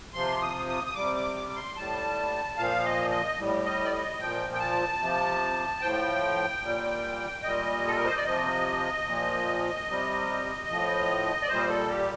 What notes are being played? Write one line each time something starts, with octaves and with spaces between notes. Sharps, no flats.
C3 F3 C6
D#6
D#6
D#6
C3 G3 D6
D6
D6
D6
C6
A2 G3 A5
A#2 F3 F5
D#5
D#5
A2 G3
D#5
D5
D#5
A#2 F3 G5
G5
A5
C3 F3
A2 F3 G5
A#2 G3
A#2 G3 D#5
A4
A#4
C5
D5
C3 F3 D#5
A#2 F3
C3 G3
A2 F3
D5
A#2 G3 C5
A4
G4